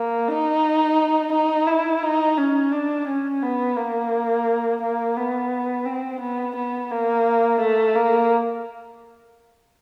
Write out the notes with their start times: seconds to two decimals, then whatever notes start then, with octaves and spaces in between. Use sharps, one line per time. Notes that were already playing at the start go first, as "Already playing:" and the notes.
Already playing: A#3
0.28 D#4
1.33 D#4
1.67 E4
2.03 D#4
2.38 C#4
2.72 D4
3.08 C#4
3.43 B3
3.77 A#3
4.82 A#3
5.17 B3
5.86 C4
6.20 B3
6.56 B3
6.91 A#3
7.60 A3
7.95 A#3